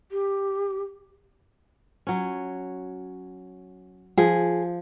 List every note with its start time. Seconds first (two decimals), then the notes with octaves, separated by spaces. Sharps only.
0.11 G4
2.07 F#3 C#4
4.18 F3 G#4